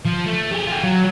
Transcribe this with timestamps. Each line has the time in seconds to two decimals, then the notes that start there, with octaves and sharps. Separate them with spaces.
0.05 F3
0.26 A3
0.51 G4 G#4
0.67 F4 G4
0.83 F#3